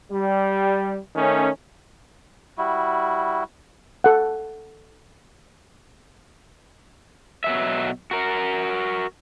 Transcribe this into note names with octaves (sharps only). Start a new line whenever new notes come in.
G3
D#3 A3 C#4
G3 E4 F#4
A4 F#5
B2 F#3 E5
F#4 A#4